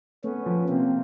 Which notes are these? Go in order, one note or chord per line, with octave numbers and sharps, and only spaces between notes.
A3 B3 C#4
F3
C3 A#3 C4